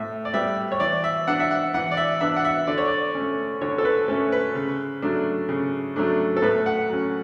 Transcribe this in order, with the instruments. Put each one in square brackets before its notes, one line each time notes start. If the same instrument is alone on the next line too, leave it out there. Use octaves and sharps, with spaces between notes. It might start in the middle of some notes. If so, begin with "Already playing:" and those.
Already playing: [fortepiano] A2 E5
D5
G3 B3 E5
C#5
E3 D5
E5
B3 D4 F#5
E5
F#5
E3 F#5
D5
E5
B3 D4 E5
F#5
E5
D3 D5
C#5
D5
A3 C#4
D3 C#5
A4
B4
A3 C#4 A4
B4
C#3
F#3 A3 D4
C#3
F#3 A3 D4
A4
A2 B4
F#5
F#3 C#4